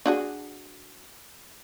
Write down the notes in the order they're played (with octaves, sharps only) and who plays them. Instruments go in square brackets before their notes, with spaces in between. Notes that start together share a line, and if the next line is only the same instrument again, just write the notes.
[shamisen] D4 F#4 G#4